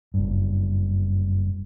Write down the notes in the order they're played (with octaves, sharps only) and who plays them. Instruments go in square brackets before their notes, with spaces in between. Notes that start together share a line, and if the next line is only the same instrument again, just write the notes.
[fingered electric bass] F#1 G2